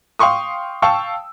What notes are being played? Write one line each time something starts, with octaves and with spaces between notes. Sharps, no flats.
F5 G5 C6 C#6 D#6
F5 G5 A5 C#6 E6